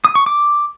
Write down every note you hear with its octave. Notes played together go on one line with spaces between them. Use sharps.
D#6
C#6
D6